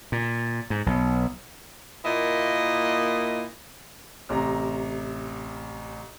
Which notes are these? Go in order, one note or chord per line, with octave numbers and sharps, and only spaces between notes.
A#2
G#2
B1
A#2 A#3 E4 D#5
A1 C3 A#5